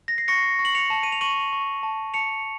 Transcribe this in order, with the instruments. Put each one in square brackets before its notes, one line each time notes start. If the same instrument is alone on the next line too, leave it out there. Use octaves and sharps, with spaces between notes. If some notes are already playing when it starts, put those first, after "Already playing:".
[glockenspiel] A#6
C7
C#6 A#6 C#7
C#6
F#7
C#7 F7
A5
D#7
F7
C#6 D#7 F#7
C#6
A5
A5 C#7 F7